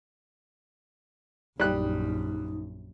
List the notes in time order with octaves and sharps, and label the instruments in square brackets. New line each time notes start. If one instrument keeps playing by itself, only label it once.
[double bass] A#1 F#2 [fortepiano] G3 F#6 [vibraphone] D#4